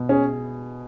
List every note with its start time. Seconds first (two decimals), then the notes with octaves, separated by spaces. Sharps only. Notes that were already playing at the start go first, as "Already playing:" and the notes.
Already playing: B2
0.09 C#4 G#4